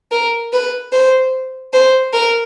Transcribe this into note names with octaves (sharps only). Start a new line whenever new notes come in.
A#4
B4
C5
C5
A#4